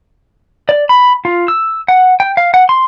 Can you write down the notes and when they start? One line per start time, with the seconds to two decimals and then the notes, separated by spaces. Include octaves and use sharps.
0.69 D5
0.89 B5
1.25 F4
1.48 E6
1.88 F#5
2.20 G5
2.37 F5
2.54 F#5
2.69 C6